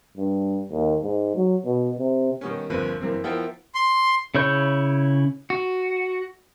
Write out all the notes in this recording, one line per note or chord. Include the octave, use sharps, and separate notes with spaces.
G2
D#2
G#2
F#3
B2
C3
D#3 G3 B3 C#4
G1 F2 A#3 C4 B4
F#2 E3 A#3 C4
F3 B3 E4 A#4 E5 G5
C6
C#3 E4 C#5 G6
F#4